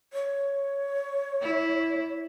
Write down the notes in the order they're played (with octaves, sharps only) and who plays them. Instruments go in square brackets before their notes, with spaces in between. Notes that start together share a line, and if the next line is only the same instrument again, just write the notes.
[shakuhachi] C#5
[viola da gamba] E4